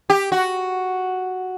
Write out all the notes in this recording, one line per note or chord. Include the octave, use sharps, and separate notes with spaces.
G4
F#4